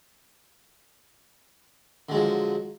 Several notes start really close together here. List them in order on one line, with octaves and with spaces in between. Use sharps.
D3 G#3 F#3 F3